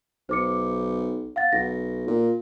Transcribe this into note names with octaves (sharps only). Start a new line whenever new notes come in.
B1 C5 D6 C#7
F5 F#5 A6
B1 A#6
A#2